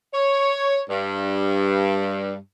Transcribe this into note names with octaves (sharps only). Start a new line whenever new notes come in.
C#5
G2